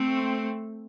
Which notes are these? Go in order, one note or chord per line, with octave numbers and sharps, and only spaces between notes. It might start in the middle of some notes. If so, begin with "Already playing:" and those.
Already playing: A3 C4